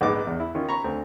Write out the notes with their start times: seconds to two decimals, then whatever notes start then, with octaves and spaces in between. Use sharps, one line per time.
0.01 A#1 G#2 B3 D#4 D6
0.27 E2
0.40 E4
0.55 D#3 C#4 F4
0.69 A#5 B5 C#6
0.84 D2 C4